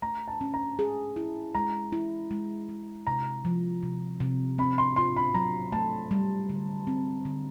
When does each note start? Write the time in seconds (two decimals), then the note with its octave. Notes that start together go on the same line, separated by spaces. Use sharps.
0.02 A3 A#5
0.28 A5
0.41 C#4
0.54 A#5
0.79 G#4
1.16 E4
1.55 G#3 A#5
1.92 E4
2.31 G#3
2.69 G#3
3.07 C3 A#5
3.45 F3
3.83 C3
4.20 C3
4.58 C4 B5
4.78 C6
4.96 F4 C6
5.16 B5
5.34 F#3 A#5
5.72 A3 A5
6.11 G3
6.49 D3
6.87 C4
7.25 D3